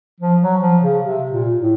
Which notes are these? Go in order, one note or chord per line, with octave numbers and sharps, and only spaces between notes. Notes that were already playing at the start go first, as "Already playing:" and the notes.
F3
F#3
F3
C#3
C3
A#2
A2